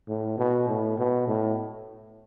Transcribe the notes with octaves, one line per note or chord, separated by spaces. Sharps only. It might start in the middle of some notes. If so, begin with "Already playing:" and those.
A2
B2
A2
B2
A2